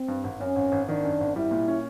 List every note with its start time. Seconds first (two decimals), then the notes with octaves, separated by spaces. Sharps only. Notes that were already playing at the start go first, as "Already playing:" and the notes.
Already playing: C4
0.08 G2
0.24 G#1
0.40 F#2 C#4
0.56 G#1
0.72 G#1
0.89 D#3 D4
1.04 F#2
1.21 G#1
1.36 G3 E4
1.51 A#2
1.68 C#4